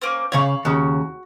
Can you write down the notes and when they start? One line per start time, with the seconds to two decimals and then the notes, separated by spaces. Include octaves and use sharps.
0.02 A#3 C#4 C5
0.32 C#3 C#5 F5 B5 C#6
0.65 D#2 C#3 F#4